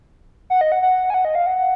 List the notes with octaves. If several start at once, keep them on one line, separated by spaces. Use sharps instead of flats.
F#5
D#5
F#5
F#5
G#5
F#5
D#5
F5
F#5